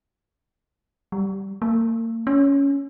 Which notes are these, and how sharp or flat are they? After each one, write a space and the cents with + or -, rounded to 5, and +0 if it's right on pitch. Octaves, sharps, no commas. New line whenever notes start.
G3 -10
A#3 -40
C#4 +10